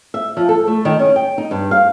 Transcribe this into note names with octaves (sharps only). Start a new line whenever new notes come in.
E5
F3
A4
A3
D#3
C#4
G5
D#4
G2
F5